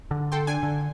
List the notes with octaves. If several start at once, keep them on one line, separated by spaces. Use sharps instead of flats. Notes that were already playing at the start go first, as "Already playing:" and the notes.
D3
A4 G5 C6
D4 G#5
D3